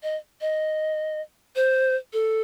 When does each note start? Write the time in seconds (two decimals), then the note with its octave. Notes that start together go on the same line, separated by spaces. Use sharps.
0.03 D#5
0.41 D#5
1.56 C5
2.13 A4